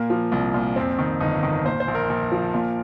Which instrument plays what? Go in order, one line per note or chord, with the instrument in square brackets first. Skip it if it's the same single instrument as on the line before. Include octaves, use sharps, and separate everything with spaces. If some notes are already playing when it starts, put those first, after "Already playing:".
Already playing: [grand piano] A#2 A#3
F3
C2
A#2
F2 C4
D#3
G1 D#4
D#3
A#2 C5
C5
A#1
A#4
A#1
F3
A#2